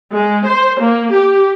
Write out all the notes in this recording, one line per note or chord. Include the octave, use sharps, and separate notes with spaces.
G#3
C5
A#3
G4